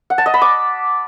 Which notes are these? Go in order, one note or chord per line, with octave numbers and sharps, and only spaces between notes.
F#5
A5
D#5
B5
D6